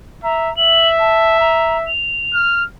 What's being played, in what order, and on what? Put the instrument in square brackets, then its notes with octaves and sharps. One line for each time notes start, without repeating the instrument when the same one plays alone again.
[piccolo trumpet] E5 [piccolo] A#5
[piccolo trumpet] E5 [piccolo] F#7
[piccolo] A5
A#5
F7
[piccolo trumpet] F6